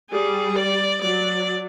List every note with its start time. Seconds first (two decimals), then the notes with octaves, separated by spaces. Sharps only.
0.10 G3 G#4
0.56 D5
1.01 F#3 D5